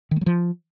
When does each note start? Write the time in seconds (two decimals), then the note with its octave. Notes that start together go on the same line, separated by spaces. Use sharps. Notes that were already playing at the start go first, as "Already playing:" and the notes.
0.11 D#3
0.16 A3
0.21 F#3
0.26 F3